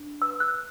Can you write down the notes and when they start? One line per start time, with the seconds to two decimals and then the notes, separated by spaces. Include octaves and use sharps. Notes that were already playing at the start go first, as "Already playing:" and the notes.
Already playing: D4
0.22 B4 E6
0.40 F#6